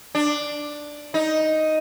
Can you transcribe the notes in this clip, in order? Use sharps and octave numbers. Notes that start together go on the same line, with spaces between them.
D4
D#4